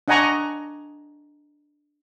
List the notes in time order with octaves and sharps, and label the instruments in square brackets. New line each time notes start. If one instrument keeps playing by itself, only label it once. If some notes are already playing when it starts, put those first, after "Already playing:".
[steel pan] D4 D#5 F#5 G#5 A#5 C#6